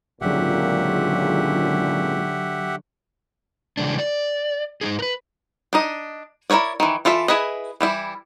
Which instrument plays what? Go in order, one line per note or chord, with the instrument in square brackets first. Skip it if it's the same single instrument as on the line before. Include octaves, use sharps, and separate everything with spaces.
[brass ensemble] G#1 C#2 A#2 [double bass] D3 F#3 [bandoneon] G4 E5 F#5
[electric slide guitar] C#3 E3 G#3 D4
D5
G#2 B2 D#4 G#4
A#4 B4
[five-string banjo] D4 D#4 D#5
E4 G#4 A#4 C#5 D5
D#3 E3
E3 F4 A4 E5
E4 G#4 B4 D#5
E3 G3 E4